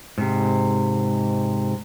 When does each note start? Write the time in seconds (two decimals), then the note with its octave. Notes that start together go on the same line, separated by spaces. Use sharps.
0.18 G#2 C3